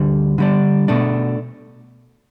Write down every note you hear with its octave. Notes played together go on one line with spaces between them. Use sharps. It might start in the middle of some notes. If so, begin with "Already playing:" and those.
Already playing: D2 D3 G3
D3 G3 D4
B2 A3 D4